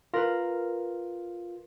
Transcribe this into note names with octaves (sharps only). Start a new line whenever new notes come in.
F4 A#4 B4